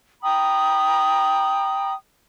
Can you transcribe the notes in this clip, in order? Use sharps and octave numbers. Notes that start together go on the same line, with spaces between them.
G5 A#5 B5 D#6